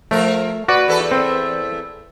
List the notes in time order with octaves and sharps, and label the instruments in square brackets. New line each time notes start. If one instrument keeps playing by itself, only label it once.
[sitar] F3 A#4 [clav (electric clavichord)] A3
[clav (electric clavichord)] F#4 D5 [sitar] B4
[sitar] E2 A4 B4
[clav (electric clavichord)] C4